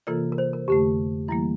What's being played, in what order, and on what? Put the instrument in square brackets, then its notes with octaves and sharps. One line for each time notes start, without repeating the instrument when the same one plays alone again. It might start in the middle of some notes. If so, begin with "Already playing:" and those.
[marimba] C3 E3 A#3 F4 A4 [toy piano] A#4 D5
[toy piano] A#4
C5
A#4
[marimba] F2 D3 A3 [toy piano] G4
[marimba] E3 G3 A#3 [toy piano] E4